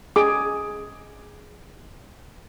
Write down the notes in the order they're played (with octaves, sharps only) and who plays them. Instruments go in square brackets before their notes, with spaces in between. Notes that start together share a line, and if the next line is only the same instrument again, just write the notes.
[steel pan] G#4 D6